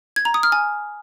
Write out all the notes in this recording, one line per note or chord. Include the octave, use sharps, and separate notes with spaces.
G#6
A#5
D#6
F6
G#5